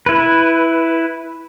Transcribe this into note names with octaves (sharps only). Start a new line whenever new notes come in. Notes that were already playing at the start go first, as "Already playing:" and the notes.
E4 B4